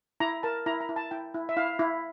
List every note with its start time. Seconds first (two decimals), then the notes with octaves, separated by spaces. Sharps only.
0.20 E4 A#5
0.43 A#4 A5
0.66 E4 A#5
0.81 A#5
0.89 E4
0.96 A5
1.11 E4 G5
1.34 E4
1.49 E5
1.57 E4 F5
1.79 E4